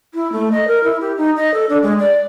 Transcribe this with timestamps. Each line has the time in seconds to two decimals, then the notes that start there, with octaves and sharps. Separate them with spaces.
0.14 E4
0.32 A3
0.51 D#5
0.68 A#4
0.84 E4
1.00 G4
1.17 D#4
1.36 D#5
1.54 A4
1.69 D4
1.82 G#3
1.99 D5